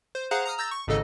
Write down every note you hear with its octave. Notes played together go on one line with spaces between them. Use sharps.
C5
G#4 C5 F5 F#5 A#5 F#6
A#5 D#6 F6
A#5 E6 G6 A6 A#6
C#6
G#1 G#2 C#3 A4 D#5 E6